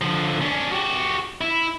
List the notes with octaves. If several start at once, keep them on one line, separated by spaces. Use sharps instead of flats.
D3 F3
C#4 D4
F#4 G4
E4